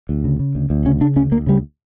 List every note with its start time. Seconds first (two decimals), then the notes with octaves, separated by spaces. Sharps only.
0.09 D2
0.24 C#3
0.39 C#3
0.55 D2
0.70 D2
0.85 C#3 C#4
1.01 C#3 D4
1.16 D2 C#4
1.31 D2 A#3
1.47 C#3 G3